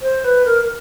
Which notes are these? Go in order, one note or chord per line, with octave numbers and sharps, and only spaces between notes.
C5
B4
A#4